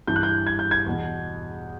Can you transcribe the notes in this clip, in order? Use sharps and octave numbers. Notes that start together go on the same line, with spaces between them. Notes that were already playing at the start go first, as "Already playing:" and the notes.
G2 E3 G6
F#6
G6
G#6
G6
G#6
E2 B2